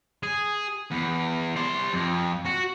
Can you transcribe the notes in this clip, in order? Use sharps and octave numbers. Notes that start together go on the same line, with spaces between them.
G#4
E2
C5 D5
F2
F#4